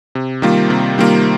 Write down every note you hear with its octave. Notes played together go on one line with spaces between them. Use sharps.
C3
D#3 G3 A#3 F4
C3
D#3 G3 A#3 F4